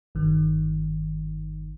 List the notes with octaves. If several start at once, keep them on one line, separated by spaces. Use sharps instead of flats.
G1 D#3